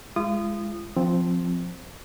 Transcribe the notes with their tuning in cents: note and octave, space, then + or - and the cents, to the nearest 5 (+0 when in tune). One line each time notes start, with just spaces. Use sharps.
G#3 -5 F4 -40 D#6 -20
F3 +10 C4 +0